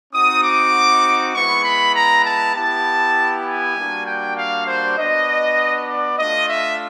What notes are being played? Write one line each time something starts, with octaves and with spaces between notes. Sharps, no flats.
C4 D#4 F#4 D#6
D6
G#3 B3 E4 C#6
B5
A#5
A5
B3 E4 G4 A5
G#5
G3 A#3 D4 F#4
G5
F5
C5
B3 D4 F#4 D#5
D5
A3 D4 F4 D#5
E5